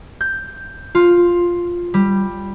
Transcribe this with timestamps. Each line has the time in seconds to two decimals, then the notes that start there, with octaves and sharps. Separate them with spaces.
0.21 G6
0.95 F4
1.94 G3